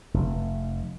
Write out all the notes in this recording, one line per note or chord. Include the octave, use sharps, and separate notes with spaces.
F1